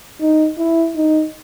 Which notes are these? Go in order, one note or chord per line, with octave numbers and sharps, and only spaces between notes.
D#4
E4
D#4